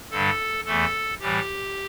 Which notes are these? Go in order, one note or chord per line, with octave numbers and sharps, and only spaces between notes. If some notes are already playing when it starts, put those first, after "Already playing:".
G2 D3 G3 A4
E2 E3 A3 A4
A2 E3 G3 G4